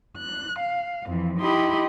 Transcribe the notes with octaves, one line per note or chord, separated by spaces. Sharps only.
F#6
F5
F2 E3
D#4 E4 G4 D#5 B5 C6